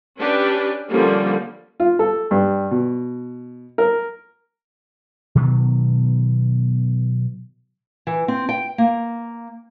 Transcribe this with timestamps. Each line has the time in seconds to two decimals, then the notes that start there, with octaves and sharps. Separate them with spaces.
0.18 C#4 D4 G4 B4
0.89 D3 F3 G3 A#3 C#4
1.80 F4
1.99 A4
2.31 G2
2.71 B2
3.78 A#4
5.35 B2 D#3 F#3 B3
8.07 E3
8.28 C4
8.49 G5
8.78 A#3